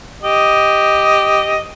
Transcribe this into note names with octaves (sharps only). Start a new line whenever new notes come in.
G4 D#5